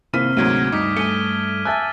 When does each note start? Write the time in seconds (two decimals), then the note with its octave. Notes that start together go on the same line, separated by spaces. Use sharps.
0.14 C3 D#3 A#3 C4 E4 F6 B6 D#7
0.37 D2 G#2 F#3 A#3 G#6 D7 D#7
0.72 G2 D#4 D6 D#6 B6
0.97 A3 G#5 C#7 D#7 G7
1.65 E5 G#5 A5 E6 F#6 A6